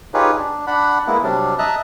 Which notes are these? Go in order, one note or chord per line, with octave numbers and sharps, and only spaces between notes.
D#4 F4 G4 G#4 B4 C#5
D4
D4 F#5 B5
G#3 A#3 B3 E4
C3 F#3 G3 D4
D#5 E5 A5 A#5 F#6